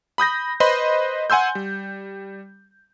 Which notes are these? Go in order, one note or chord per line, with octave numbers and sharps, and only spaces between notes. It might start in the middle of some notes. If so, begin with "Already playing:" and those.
B5 D#6 G6 A#6
B4 C5 D#5 B5 C6
F#5 G#5 C6 E6 G6
G3